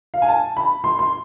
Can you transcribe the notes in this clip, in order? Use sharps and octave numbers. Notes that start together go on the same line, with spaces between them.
F5
G#5
A5
B5
C6
C6